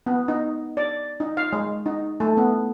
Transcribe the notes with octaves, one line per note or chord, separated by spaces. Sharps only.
B3
D#4
D5
D#4
F5
G#3
D#4
A3
B3